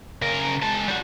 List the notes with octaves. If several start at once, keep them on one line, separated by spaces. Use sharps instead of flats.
C#3 A#4
G#3 A5
G3 F#4